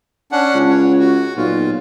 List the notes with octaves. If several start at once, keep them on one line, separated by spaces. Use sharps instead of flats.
C#4 D4 F#5
C#2
C#5
F#4
B1 A#2 F4